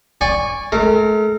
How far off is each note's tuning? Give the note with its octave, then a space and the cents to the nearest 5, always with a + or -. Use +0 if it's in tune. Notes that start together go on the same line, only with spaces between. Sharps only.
D5 +0 G#5 -20 C#6 +0
A3 -45 A#4 -25